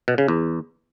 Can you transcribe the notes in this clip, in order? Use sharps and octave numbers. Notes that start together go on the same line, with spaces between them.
B2
C#3
E2